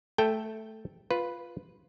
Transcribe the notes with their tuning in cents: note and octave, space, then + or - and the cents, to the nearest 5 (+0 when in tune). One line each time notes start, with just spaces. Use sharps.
A3 -5 A4 +0 G5 +0
F4 +0 B4 +0